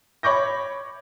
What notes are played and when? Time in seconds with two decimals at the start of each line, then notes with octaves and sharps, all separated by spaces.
0.23 C#5 B5 C#6 D6 G6 A#6